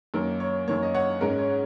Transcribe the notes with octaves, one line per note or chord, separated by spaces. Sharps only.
F#2 D#3 A#3 A#4
C#5
F#2 D#3 A#3 C#5
D#5
C#5 F#5
G#2 G#3 C#4 A#4
C#5